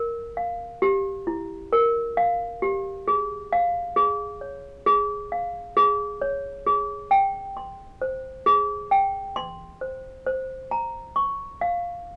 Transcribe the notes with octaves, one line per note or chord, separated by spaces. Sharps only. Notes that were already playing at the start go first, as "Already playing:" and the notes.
Already playing: A#4
F5
G4
E4
A#4
F5
G4
G#4
F5
G#4
C#5
G#4
F5
G#4
C#5
G#4
G5
C6
C5
G#4
G5
C6
C5
C5
A#5
C#6
F5